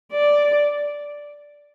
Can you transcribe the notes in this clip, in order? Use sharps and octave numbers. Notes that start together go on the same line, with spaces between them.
D5